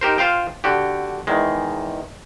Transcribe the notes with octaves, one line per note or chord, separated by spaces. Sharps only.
D#4 G4 A#4 C5
F4 C5 F5 G5
D3 F#4 G4
E2 D#3 G#3